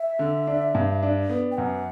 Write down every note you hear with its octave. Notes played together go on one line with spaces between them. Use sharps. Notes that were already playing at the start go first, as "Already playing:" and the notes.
Already playing: E5
D3
D4
G2
D4
B3
G5
F#2 F#5